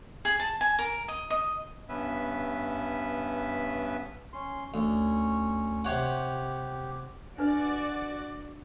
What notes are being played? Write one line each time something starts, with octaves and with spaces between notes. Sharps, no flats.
G#4
A5
G#5
A#4
D#5
D#5
G2 B3 C#4 B4 E5
C#4 C6
D2 C#4
C3 G4 C#5 F#5
D4 F#4 B4 D5